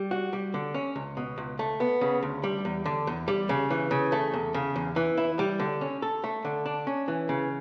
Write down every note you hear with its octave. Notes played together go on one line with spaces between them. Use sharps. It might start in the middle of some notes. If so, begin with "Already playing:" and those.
Already playing: G3
F#4
G3
D3
C#4
C#2
B2
C#2
A3
B3
C#3
D2
G3
E2
D3
E2
G3
C#3
E3
C#3
A3
E2
C#3
E2
E3
E4
G3
D3
C#4
A4
A3
D3
D4
C#4
E3
C#3